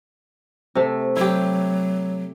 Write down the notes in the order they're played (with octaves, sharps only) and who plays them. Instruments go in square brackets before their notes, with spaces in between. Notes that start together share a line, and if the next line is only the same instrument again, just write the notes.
[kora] C3 A3
[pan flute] F#3 [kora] E4 G4